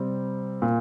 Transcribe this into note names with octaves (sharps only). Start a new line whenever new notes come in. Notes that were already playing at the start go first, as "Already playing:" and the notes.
Already playing: C3 G3 C4
A#2